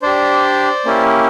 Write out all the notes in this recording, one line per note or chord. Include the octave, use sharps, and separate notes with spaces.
D4 G4 C5 D5
A#3 C#4 E4 G4